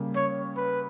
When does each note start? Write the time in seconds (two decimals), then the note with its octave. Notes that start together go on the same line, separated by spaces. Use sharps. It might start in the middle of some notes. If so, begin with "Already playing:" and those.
Already playing: C#3 G3 A#3
0.15 C#5
0.56 B4